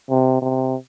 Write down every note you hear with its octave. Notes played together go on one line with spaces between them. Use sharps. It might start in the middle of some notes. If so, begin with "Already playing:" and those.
C3
C3